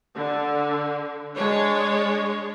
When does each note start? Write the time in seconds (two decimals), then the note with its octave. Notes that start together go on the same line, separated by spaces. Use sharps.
0.15 D3
1.34 G#3 D4 C#5